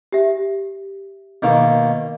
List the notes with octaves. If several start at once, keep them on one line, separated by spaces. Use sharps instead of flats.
G4 E5
B2 D#3 A#3